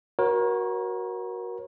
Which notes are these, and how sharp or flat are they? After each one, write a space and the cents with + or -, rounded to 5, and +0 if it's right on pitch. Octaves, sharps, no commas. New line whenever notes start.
F#4 +0 A#4 +30 C#5 -30